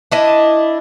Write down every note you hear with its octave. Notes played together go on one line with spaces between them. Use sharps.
D4 E4 D#5